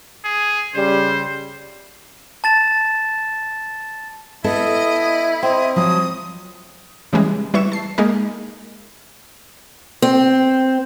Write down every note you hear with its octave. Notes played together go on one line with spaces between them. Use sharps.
G#4
C#3 G3 C5
A5 A6 E7
B3 E4 A4 D#5
C4 D#5
F3 F#3 D#6
C#3 E3 G3 G#3
G3 E4 B4 C#6 E7
A5 C7
G#3 A#3 D#4 G#4 A#4
C4